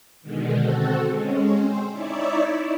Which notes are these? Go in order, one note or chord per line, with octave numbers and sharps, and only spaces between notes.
B2 D3 D#3 G#3
C4 F#4 A4
G#3 C#4
C4 C5
D#4 E4 C#5 D5 E5
E4